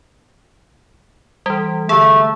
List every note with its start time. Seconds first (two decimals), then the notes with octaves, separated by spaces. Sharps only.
1.46 E3 G3
1.89 D3 A3 G#4